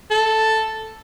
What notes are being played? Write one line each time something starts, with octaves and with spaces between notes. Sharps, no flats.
A4